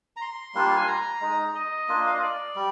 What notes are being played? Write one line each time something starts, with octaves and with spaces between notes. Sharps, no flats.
A#5
C6
G3 A#3 D4 F4
G#5
A#5
G#3 D#4
D#5
A#3 D4 F4
F5
D#5
D5
G3